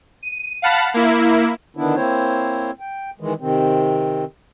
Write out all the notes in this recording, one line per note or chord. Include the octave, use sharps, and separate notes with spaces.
D#7
F5 F#5 A5 B5
A#3 E4
D3 D#3 B3 D4 E4
A#3 C4 E4 C5 C#5
G5
D#3 E3 G#3
C3 D#3 C4